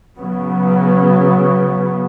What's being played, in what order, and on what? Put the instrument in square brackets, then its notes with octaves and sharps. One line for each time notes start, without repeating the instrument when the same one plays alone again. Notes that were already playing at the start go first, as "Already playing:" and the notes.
[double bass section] C#3 F#3 B3